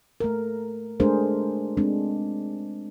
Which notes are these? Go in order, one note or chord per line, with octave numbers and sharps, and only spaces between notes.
A3 A#4
G#3 A3 D4 G#4 A#4 C5
G#3 C4 D4